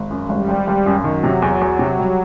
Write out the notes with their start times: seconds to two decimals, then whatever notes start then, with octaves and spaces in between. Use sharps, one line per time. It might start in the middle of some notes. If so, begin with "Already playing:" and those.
Already playing: G#1
0.11 F#2
0.29 G#1 G3
0.48 G#1
0.67 G#1
0.86 F#2
1.04 D#3 F#3
1.24 C3
1.42 E2
1.61 E2
1.79 C3
1.99 G3